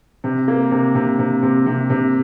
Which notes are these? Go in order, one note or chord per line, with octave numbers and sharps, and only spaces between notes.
C3
A#3
C3
C3
C3
C3
C3
C3